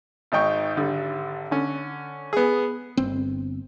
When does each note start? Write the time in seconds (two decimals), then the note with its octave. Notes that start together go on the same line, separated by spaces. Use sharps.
0.32 G#1 G#2 D#4 G5 C#6
0.77 G#1 D3 G3
1.51 D3 C#4
2.33 B3 G#4
2.97 G1 C4